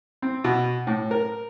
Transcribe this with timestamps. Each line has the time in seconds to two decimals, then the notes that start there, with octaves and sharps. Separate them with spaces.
0.22 C4
0.44 B2
0.87 A2
1.11 A#4